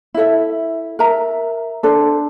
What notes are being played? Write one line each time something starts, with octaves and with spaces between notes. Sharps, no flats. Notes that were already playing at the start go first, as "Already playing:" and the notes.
E4 A4 E5
A#4 E5 A#5
D4 A4 C5